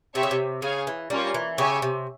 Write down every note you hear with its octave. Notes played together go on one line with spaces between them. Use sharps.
C3 C4 G4 C#5 E5 G5
C#3
C3
C#3 G#4 C#5 F5 G#5
E3
G3 A#3 C#4 F4 A#4 C#5
E3
C#3 G4 C#5 E5 G#5
C3